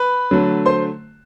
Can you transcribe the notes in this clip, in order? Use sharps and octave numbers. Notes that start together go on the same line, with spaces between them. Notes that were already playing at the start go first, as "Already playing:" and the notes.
Already playing: B4 B5
D3 F#3 A3
C5 C6